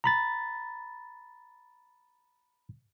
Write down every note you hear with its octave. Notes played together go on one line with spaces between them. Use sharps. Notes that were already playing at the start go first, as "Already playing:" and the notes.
A#5 B5 A6